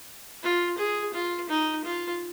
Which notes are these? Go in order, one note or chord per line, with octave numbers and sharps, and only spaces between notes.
F4
G#4
F4
D#4
F4